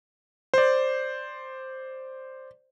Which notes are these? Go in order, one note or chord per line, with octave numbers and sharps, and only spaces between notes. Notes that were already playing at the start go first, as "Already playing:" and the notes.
C5 D5